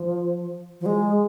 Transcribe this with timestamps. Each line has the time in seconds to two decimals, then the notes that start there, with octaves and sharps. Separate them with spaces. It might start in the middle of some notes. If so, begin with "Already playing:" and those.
Already playing: F3
0.81 F3
0.86 G#3